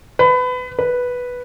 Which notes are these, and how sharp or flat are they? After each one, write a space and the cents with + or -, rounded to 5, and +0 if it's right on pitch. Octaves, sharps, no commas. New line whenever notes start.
B4 +25
B4 -5